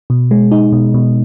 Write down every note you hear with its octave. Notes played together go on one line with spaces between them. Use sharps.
B2
G#3
D#4
B2
B2